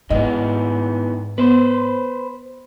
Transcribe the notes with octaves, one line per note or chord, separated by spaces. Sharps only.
G#2 D#3 E3 B3 D#5
B3 B4 C5